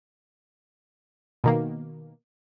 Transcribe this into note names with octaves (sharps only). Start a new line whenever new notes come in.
B2 D#3 A#3